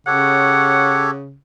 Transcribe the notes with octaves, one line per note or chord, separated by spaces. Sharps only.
C#3 G4 A4 C#5 F#5